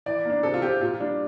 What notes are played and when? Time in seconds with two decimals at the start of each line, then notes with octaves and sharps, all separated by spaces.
0.06 E3 D5
0.25 A#3
0.30 D4
0.43 C3 A4
0.54 F4
0.62 F3 C4 G4
0.81 A#2 F4
1.00 G3 D4